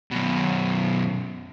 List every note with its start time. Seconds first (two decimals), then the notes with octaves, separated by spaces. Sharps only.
0.11 F#2 B2